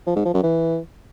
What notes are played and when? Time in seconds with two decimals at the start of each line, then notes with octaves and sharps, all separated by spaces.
0.07 F3
0.16 G#2
0.25 F3
0.34 F#2
0.43 E3